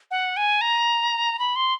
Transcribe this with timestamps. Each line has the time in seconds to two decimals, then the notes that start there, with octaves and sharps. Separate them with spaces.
0.11 F#5
0.37 G#5
0.61 A#5
1.39 B5
1.56 C6